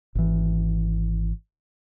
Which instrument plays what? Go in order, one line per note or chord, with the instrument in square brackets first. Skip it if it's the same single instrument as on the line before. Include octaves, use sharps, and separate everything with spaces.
[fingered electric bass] G#1 E3